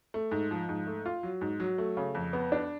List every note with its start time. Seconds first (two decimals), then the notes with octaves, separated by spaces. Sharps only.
0.14 A3
0.31 G#2
0.51 F3
0.69 G#2
0.87 A3
1.06 F4
1.23 F#3
1.41 G#2
1.60 F#3
1.78 A3
1.97 C#3
2.15 F2
2.33 B3
2.52 D4